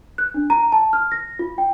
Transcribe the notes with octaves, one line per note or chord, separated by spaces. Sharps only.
F#6
D4
A#5
A5
F6
A#6
F4
G5